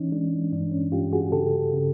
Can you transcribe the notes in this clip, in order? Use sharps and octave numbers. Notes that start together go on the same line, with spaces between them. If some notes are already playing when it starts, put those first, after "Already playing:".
Already playing: E3 C#4 D#4
G#3 D4
G2 D4
C#4
G2 F4 G4
F#4 G#4
C#3 G4 A4
C#3